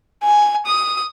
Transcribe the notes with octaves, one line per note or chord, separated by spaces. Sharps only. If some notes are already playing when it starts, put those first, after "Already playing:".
G#5
D#6